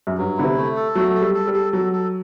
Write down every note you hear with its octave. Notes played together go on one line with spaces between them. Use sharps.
F#2
G2 F#3
D3 E4
C3
A3
A4
F#3 A3
A4
G3
A4
G3
A4
F#3 A4
A4